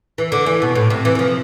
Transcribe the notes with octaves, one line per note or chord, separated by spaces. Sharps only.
E3
D3
E3
B2
A2
C3
E3
E3
F3